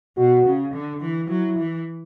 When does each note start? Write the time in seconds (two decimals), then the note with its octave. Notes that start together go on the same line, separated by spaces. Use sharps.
0.17 B2 F#4
0.46 C#3
0.74 D3
1.01 E3
1.29 F#3 E4
1.58 E3